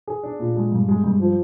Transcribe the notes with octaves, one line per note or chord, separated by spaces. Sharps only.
G#4
D4
A#2
G#3
G2
G#3
G2
F3